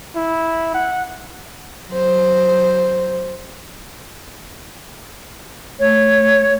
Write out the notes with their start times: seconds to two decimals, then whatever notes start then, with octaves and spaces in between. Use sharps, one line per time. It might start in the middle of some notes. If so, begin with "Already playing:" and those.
0.16 E4
0.74 F#5
1.89 F#3 C5
5.80 A3 C#5